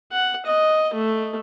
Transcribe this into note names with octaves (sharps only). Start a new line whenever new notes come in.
F#5
D#5
A3